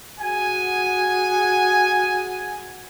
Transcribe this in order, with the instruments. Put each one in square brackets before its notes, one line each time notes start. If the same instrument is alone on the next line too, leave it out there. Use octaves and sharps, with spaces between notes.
[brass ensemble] F#4 G#4 F#5 G#5